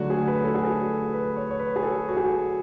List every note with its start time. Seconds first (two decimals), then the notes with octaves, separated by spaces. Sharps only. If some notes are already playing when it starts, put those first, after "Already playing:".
Already playing: D3 F#3 A3 F#4
0.10 G#4
0.27 B4
0.45 A4
0.55 G#4
0.65 A4
1.13 B4
1.37 C#5
1.51 C#5
1.59 B4
1.76 G#4
1.83 A4
2.09 F#4
2.17 G#4